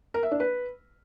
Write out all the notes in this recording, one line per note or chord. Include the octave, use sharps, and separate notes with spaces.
A#4
E5
D4
B4